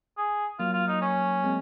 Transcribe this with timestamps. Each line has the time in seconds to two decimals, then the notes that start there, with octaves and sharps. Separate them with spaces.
0.18 G#4
0.59 F#3 A#3 F4
0.73 F4
0.88 D#4
1.02 C#4
1.44 G#3 C4